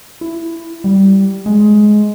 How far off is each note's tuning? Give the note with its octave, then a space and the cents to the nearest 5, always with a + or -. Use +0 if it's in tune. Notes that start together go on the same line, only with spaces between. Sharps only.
E4 +15
G3 -10
G#3 +15